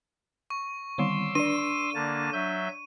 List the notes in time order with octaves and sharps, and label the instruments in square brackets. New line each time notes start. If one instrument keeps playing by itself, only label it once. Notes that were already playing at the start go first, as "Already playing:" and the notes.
[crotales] C#6
[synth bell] D3 D#3 G3 [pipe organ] C6 D6 E6
[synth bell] D4 D5 [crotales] D#7
[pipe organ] D3 A#3 A5
F#3 E5 G6